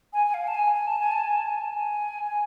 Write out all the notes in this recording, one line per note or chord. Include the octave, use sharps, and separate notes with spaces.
G#5
G#5
F5
A5
G#5
G#5
A5
G#5
A5
G#5
A5
G#5
A5
G#5
G#5